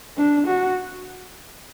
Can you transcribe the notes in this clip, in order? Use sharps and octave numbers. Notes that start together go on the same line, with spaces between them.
D4
F#4